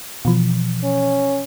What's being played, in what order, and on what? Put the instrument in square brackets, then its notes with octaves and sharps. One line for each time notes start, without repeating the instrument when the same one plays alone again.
[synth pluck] B2 E3 F3
[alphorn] C#4